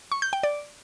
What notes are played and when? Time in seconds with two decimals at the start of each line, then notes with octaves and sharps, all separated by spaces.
0.12 C#6
0.22 G6
0.33 G5
0.43 D5